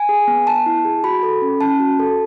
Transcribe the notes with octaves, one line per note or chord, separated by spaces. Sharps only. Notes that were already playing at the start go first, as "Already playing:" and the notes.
Already playing: G#5
G#4
B3
B3 A5
E4
G#4
F#4 B5
A4
C#4
C#4 A5
F#4
A4